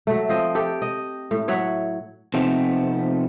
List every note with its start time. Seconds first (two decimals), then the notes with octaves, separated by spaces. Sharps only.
0.07 F#3 A3
0.29 F3 C4 D#5
0.55 G4 A4 G5
0.82 D#5
1.31 A2
1.48 F#3 C#5 E5 F#5
2.34 C3 F3 A3 B3 C4 D#4